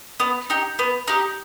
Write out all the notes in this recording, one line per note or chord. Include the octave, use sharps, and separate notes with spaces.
B3
D#4 G4
B3
D#4 G4